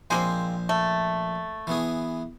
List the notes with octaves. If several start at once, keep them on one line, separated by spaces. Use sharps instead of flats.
A#1 G#3 A#3 C4 C5 G#5
A3
E3 B3 G#4